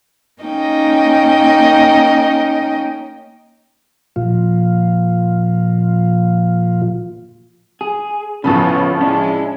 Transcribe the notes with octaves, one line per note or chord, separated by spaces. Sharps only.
A#3 C#4 D#4 D#5 G5
A#2 F3 F4
G#4
A1 C#3 F3 B3 C#4 A4 B5
G#3 C#4 D4 E4